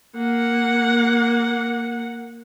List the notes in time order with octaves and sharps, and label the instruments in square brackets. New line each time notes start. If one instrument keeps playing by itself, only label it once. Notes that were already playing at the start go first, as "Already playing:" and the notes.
[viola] A#3 F#5